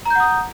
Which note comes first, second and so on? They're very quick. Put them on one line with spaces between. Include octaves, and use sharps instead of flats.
A#5 G6 F#5 D#6